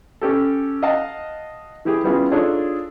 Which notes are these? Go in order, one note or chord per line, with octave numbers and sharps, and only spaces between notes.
C#4 G4 A4
D#5 F5 F#5 A5
E3 E4 G4 G#4
G3 B3 C#4 E4 F4 G#4
D4 D#4 F4 G#4 A4 C#5